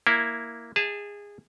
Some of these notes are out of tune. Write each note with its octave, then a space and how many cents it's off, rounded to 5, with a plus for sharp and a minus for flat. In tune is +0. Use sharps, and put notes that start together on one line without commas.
A#3 +0 E4 +0
G#4 -20 E5 -15 A5 +0